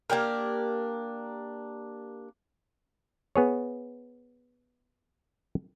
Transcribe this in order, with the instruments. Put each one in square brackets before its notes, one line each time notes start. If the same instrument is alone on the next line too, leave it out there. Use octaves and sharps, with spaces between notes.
[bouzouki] A#3 D4 G4 A#4
[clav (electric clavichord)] B3 G#4 C#5